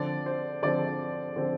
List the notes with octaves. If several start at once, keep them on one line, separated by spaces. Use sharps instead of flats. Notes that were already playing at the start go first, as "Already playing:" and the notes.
Already playing: D3 F3 C4 D5
C5
D3 F3 C4 D5
D3 F3 C4